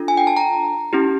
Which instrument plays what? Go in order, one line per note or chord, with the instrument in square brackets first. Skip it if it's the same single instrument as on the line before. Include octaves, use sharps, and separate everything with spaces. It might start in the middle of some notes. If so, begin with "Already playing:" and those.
Already playing: [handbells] D4 F4 A4
G#5
G5
A5
A#5
C#4 E4 G4